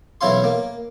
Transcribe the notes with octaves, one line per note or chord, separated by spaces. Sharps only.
B1 E3 C#4 E4 F5 C6
A#3